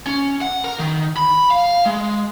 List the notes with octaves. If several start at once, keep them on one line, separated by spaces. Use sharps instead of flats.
C#4
F#5
A#4
D#3
B5
F5
G#3